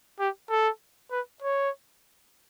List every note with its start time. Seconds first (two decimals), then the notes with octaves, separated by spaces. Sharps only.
0.20 G4
0.50 A4
1.11 B4
1.42 C#5